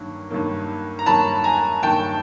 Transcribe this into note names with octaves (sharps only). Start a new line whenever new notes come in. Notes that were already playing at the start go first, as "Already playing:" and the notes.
Already playing: G2 D#3 F#3 A#3
G2 D#3 F#3 A#3
A#5
G2 D#3 F#3 A#3 A5 B5
G#5 A#5
G2 D#3 F#3 A#3 G5 A5